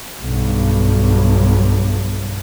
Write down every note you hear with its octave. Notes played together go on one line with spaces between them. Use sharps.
B1 G2